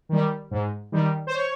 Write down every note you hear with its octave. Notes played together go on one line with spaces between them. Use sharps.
D#3 G3
G#2
D#3 G3
C5
C#5